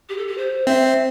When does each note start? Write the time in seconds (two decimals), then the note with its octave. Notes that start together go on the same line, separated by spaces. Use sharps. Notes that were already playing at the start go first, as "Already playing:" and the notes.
0.09 G4
0.17 A4
0.27 G4
0.37 C5
0.67 C4 E5
0.84 E5